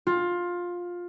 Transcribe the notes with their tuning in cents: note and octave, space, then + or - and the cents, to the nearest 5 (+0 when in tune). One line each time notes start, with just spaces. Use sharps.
F4 +15